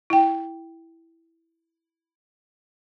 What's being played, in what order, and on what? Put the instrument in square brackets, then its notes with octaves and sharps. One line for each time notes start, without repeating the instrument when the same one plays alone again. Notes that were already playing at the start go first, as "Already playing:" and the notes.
[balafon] E4 G5